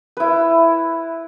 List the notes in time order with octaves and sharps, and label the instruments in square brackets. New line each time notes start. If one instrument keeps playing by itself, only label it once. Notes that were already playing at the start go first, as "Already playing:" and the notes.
[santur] E4 B4